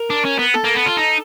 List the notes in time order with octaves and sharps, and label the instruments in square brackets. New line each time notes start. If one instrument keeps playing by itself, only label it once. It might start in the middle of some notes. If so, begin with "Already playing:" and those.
Already playing: [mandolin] A#4
[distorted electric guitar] D4
C#4
B3
[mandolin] A4
[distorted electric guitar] A#3
B3
F4
D#4